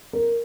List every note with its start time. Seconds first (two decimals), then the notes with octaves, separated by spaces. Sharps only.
0.13 A#4